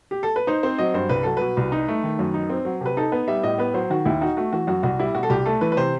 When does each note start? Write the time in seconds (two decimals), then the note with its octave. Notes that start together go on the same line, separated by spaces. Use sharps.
0.11 G4
0.23 A4
0.36 B4
0.47 D#4 C5
0.63 C4 C5
0.78 F#3 D#5
0.94 G2 C5
1.09 C2 B4
1.23 F#3 A4
1.37 B2 B4
1.57 C2
1.72 D#4
1.88 A3
2.03 D#3
2.19 F#2
2.34 D#4
2.50 C4
2.65 F#3
2.81 C3 B4
2.97 D#4 A4
3.12 B3 B4
3.28 G3 E5
3.43 A2 D#5
3.58 B3 B4
3.74 F#3 C5
3.90 D#3 F#4
4.05 D#2 E4
4.21 D#4 F#4
4.37 A3 F#4
4.53 E3 F#4
4.67 F#2 F#4
4.83 C2 F#4
4.99 G3 E4
5.15 B2 F#4
5.23 A4
5.30 C2 G4
5.46 A3 A4
5.61 E3 B4
5.72 B4
5.77 C3 C5